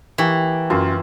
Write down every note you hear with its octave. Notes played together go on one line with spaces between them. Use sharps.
E3 A#3 G4 C#6
F#2 A#3 F4